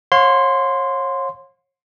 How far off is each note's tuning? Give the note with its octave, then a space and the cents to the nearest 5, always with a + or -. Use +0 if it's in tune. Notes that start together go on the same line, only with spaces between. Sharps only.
C#5 -35 F5 +40 C6 -5